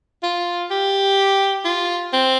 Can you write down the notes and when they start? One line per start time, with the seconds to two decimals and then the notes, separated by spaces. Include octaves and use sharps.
0.23 F4
0.70 G4
1.65 F4
2.13 C4